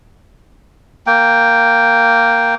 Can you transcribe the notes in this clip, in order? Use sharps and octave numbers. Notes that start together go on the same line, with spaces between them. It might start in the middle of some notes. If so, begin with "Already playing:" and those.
A#3 G5